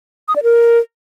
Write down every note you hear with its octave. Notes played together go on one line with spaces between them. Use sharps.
D#6
D5
A#4